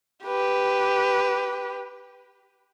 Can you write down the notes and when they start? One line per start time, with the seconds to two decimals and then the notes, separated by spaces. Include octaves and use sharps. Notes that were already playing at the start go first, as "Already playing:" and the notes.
0.24 G4 B4